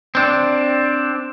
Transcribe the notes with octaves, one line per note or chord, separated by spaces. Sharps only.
C4 D4